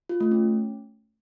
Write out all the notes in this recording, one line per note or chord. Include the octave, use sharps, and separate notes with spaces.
F4
A3
C#4